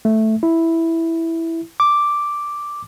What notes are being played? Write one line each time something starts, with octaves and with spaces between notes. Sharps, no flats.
A3
E4
D6